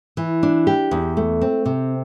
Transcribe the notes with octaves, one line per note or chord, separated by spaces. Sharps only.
E3
D4
G4
E2
A3
C4
C3